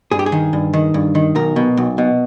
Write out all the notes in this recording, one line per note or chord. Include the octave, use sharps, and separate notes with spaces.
G2 G#4
G4
G#4
D#3
G2
D#3
G2
D#3
B1 A#4
B2
B1
B2